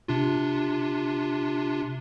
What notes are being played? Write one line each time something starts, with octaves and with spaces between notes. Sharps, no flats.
C3 D4 F4